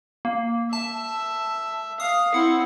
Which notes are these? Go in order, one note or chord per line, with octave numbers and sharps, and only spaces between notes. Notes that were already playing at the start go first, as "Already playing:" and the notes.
A#3
E5 A5
F5 D#6
C4 E4 F#5